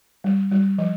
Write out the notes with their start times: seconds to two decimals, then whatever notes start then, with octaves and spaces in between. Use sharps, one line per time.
0.24 G3
0.51 G3
0.78 F3